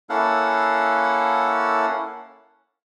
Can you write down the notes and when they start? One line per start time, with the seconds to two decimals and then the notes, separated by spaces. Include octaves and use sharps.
0.10 A#3 C#4 E4 A4 F5 F#5